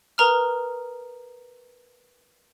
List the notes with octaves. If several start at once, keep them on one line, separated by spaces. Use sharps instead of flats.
A#4 B4 A#5 D#6 F6